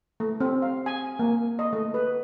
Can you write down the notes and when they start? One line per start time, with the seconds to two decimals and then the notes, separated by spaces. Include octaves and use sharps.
0.20 A3
0.41 C4
0.62 F5
0.86 G#5
1.19 A#3
1.59 D#5
1.73 A3
1.94 B4